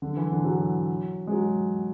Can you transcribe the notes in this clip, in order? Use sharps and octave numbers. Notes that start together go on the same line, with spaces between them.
D3
E3
D3
F#3
G#3
F#3